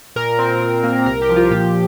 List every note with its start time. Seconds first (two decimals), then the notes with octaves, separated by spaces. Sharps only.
0.16 A#2 A#4
0.39 C4
0.61 A#2
0.83 A#3
1.06 C2 A#4
1.22 G4
1.29 F3
1.36 F4
1.51 A#2 G4